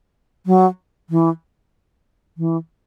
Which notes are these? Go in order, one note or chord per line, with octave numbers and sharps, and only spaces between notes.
F#3
E3
E3